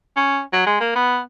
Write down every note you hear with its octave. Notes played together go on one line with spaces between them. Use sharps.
C#4
F#3
G#3
A#3
B3